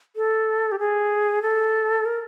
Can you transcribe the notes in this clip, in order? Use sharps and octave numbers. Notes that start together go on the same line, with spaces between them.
A4
G4
G#4
A4
A#4